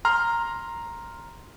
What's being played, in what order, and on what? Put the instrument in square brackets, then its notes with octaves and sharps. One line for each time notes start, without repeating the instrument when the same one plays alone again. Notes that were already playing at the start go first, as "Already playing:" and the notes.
[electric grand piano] A#5 C6 F6